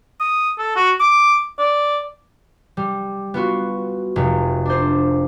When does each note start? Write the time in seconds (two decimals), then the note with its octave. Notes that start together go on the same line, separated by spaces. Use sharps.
0.20 D#6
0.59 A4
0.76 F#4
1.00 D6
1.59 D5
2.77 G3
3.34 B3 F4 F#4
4.16 F1
4.65 D4 C5